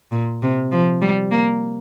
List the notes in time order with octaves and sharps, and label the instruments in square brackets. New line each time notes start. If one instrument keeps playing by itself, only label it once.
[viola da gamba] A#2
C3
F3
G3
A#3